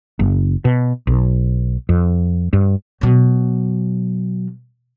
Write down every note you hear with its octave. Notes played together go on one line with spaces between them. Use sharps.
F#1
B2
B1
F2
G2
B2 F#3